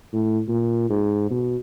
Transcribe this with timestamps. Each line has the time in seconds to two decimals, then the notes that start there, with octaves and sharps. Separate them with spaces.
0.13 A2
0.48 A#2
0.90 G#2
1.30 B2